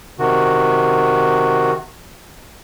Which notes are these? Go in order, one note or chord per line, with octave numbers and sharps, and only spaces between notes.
C3 D#3 F#4